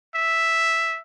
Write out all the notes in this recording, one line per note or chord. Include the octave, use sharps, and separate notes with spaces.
E5